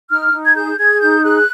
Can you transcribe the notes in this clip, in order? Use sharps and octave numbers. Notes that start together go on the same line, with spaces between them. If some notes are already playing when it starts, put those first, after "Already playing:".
D#4 F6
D#4
G#6
G#4 G6
G#4 G#6
D#4 G6
G#4 F#6